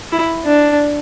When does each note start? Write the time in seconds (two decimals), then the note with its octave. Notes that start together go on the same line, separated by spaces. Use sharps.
0.12 E4
0.45 D4